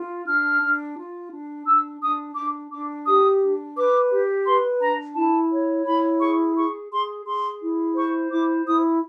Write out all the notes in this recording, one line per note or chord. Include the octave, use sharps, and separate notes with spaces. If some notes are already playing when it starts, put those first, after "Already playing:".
Already playing: F4
D4 F6
D4
F4
D4
D4 E6
D4 D#6
D4 D6
D4 D6
G4 D#6
D4
B4 D6
G4
B4 C6
D4 A#5
E4 A5
C#5
E4 B5
G#4 C#6
G#4 C#6
G#4 C6
G#4 C6
E4
C5 C#6
E4 D6
E4 D#6